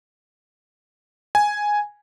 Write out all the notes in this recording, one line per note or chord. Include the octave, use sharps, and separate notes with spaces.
G#5